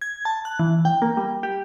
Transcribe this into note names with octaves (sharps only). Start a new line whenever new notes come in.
G#6
A5
F#6
E3
G5
A#3
G3
G4